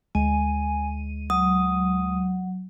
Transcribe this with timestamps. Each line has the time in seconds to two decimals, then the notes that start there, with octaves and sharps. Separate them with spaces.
0.15 D2 G#3 G#5 D#7
1.30 F#3 D#6